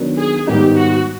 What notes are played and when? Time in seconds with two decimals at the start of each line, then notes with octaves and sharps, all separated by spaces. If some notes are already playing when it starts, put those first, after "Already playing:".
Already playing: D#3 F#3 B3 D4
0.18 G#4
0.47 G#2 D#3 G3 B3 D#4 G4
0.76 F#4